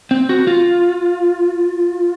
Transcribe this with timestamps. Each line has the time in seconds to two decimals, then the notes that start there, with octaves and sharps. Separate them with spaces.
0.11 C4
0.29 F#4
0.47 F4